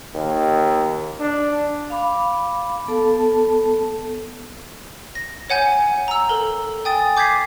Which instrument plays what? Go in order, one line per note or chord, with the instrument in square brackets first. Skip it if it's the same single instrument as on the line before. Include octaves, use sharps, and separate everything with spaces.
[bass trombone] D#2
D4
[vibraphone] F5 B5 D6
B3 A4 A5
[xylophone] A#6
C#5 F#5 G#5 G6
A#5 E6
A4 A#4
G5 G#5 D#6 A6
D6 G6 G#6 B6 C7